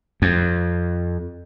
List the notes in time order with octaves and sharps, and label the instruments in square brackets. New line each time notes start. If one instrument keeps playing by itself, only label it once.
[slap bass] F2